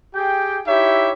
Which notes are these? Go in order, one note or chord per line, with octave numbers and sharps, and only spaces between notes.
G4 G#4 G5
D#4 E4 G4 C#5 E5